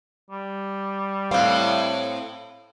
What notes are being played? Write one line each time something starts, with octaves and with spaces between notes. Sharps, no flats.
G3
A2 C4 F5